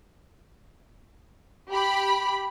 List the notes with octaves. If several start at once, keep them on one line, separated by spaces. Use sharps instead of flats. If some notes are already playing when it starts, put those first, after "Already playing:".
G4 B5